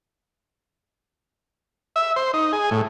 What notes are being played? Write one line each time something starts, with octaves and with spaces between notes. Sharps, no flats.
E5
C5
D#4
G#4
A2